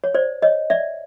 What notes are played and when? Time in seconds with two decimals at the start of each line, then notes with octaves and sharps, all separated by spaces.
0.04 C#5
0.14 C5 D5
0.42 C#5 D#5
0.70 D5 E5